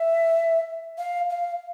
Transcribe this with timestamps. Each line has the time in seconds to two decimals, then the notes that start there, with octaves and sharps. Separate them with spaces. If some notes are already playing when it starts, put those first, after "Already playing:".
Already playing: E5
0.98 F5
1.30 F5